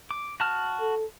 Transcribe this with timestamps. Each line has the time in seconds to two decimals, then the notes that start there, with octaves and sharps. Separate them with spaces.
0.11 D6
0.40 F#4 A5 F6
0.80 A4